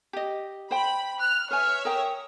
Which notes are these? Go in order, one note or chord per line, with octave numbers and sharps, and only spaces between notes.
G4 D#5
C5 G5 B5
F6 F#6
B4 C#5 E5 G#5 F6
A#4 G5 D#6